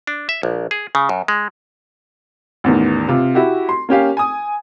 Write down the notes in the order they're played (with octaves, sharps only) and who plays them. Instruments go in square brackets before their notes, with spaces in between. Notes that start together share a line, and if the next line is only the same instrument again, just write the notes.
[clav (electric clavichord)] D4
E5
A#1
G#4
C#3
F#2
G#3
[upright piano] A1 E2 D#3
C3 F4
E4 F#4 G4
C6
A#3 C#4 G4 F5
G#5 D#6